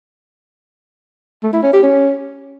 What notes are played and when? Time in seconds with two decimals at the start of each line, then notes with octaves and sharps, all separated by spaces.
1.43 A3
1.53 E4
1.63 C#4
1.73 G4
1.83 C#4